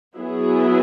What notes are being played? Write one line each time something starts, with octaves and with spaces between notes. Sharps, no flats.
F#3 B3 E4 G#4